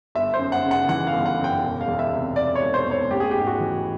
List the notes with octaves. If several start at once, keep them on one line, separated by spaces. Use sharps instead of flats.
G1 E5
C5
F#2
F#5
C#3
F#5
E3 F#5
F5
G1
F#5
F#2
G5
E1
F5
E2
E5
C3
E1 D5
C#5
E1
C5
E2
C#5
A1 G4
G#4
G#2 G4
F#4
E3